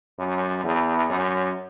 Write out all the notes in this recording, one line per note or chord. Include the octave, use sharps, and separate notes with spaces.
F#2
E2
F#2